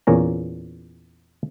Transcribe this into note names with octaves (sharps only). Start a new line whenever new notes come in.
E2 A#2 C#4 A#5